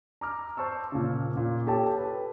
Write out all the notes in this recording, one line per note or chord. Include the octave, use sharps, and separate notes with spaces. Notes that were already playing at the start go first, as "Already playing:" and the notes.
A#5 D6 F6
C5 A5 C#6 E6
A#2 C#3
A#2
G4 A4 C#5 G5 A5
B4